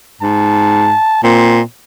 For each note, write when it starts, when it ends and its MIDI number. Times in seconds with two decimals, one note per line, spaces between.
0.21 0.95 44
0.21 1.20 81
1.23 1.61 46
1.23 1.62 60